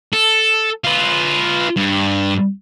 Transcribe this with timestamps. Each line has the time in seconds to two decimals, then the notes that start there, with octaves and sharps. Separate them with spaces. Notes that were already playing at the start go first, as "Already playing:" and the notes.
0.13 A4
0.84 F4 B4
1.76 G2